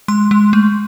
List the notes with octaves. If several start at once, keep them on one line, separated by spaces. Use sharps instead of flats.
G#3 C6
G#3
A3